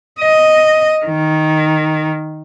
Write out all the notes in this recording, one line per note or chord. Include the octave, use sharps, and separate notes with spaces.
D#5
D#3